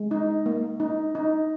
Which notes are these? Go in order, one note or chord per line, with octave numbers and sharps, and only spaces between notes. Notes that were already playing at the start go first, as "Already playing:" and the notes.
Already playing: G#3
D#4
A#3
D#4
D#4